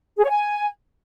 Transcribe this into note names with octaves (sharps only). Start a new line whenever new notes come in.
G#4
C#5
G#5